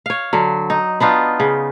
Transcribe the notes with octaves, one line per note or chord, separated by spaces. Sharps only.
C#5 F5
D3 F#3
D#4
B3 D4 D#4 F4
C#3